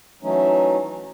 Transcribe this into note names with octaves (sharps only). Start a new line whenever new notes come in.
E3 F#3 A3 C#4 D#4